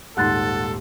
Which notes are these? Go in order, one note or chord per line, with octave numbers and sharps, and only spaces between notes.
D#1 G#2 A4 F#5 C6 F#6 A6